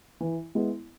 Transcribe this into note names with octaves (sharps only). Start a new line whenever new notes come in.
E3
G#3 B3 E4